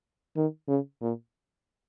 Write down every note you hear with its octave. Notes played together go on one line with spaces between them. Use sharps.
D#3
C#3
A#2